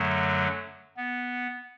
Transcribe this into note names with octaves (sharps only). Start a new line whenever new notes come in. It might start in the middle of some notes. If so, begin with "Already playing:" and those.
Already playing: F#2 D3 F#3 A3
B3